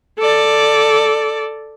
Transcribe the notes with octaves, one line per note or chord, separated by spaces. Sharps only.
A4 D5